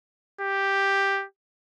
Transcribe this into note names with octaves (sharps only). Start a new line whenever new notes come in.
G4